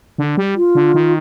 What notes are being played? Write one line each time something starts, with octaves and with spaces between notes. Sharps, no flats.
D3
G3
F4
D3
D#3